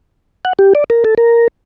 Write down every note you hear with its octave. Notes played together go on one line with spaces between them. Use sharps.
F#5
G4
D5
A#4
A4
A#4